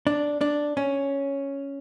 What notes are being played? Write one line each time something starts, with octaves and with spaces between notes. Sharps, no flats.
D4
D4
C#4